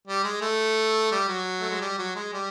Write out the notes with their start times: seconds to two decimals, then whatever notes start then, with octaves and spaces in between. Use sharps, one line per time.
0.07 G3
0.24 G#3
0.41 A3
1.12 G3
1.28 F#3
1.60 A3
1.70 G#3
1.81 G3
1.98 F#3
2.15 G#3
2.32 G3